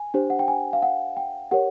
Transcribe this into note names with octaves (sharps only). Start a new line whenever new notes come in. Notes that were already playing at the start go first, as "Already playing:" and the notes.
Already playing: G#5
D4 G4 C5
F#5
G5
G#5
F5
F#5
G5
G4 A#4 C#5 F#5